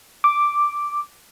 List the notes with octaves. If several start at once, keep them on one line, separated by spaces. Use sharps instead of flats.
D6